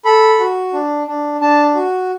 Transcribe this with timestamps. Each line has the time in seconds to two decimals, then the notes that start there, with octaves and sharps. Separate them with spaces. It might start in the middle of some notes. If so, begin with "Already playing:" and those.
0.05 A4 B5
0.39 F#4
0.73 D4
1.07 D4
1.41 D4 A5
1.75 F#4